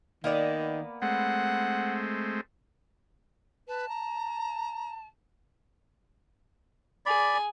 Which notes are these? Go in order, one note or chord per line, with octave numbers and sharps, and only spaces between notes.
D#3 A#3 B3 D5
G#3 A3 C4 F#5
B4 A5
A#5
G#4 D5 B5